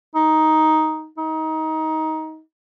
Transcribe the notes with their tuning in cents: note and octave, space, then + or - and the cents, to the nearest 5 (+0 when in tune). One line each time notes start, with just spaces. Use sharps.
D#4 +5
D#4 +20